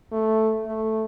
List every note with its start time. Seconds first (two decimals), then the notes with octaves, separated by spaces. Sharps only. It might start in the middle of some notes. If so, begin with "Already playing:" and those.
0.12 A3
0.66 A3